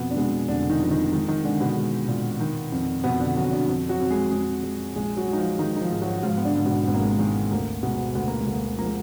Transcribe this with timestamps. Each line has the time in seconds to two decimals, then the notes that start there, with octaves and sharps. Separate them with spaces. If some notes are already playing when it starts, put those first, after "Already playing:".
Already playing: F2 B2 B3
0.11 D4
0.17 B2 G#3 B3
0.48 F1 D3 D4
0.70 D#3 D#4
0.81 F3
0.91 D#3 D#4
1.12 D#3 G#3 D#4
1.28 D#3 D#4
1.44 D3 G#3 D4
1.60 B2 B3
1.76 G#3
2.08 A#2
2.40 D#3
2.72 F2
3.04 F2 B2 B3
3.20 D3 D4
3.36 F2 F#3 F#4
3.52 D3 D4
3.68 F2
3.89 F#3 F#4
4.00 F2
4.10 G#3 G#4
4.31 F2 G#3 G#4
4.63 G#3
4.96 A#1 G#3 G#4
5.17 F#3 F#4
5.28 G#3
5.33 D#4
5.38 F3 F4
5.59 D#3 G#3 D#4
5.76 D#4
5.81 F3 F4
5.91 G#2
6.02 F#3 F#4
6.17 F#4
6.23 G#2 F3 F4
6.37 B3
6.45 D3 D4
6.55 G#2
6.66 B2 B3
6.88 G#1 B3
6.94 A#3
7.01 G#3
7.09 A#3
7.19 D#3 G#3
7.51 D2 A#3
7.83 B2 G#3 B3
8.15 D2 B3
8.28 A#3
8.40 G#3
8.47 D2
8.53 A#3
8.79 F3 A#3
8.86 G#3